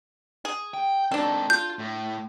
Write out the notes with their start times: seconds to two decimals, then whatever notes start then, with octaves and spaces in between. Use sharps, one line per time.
0.45 G#4
0.74 G5
1.12 C4 D4 D#4 A4
1.50 F4 G6
1.79 A2